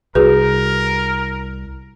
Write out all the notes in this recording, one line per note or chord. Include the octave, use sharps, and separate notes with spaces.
C2 F#4 G#4 A#4 B4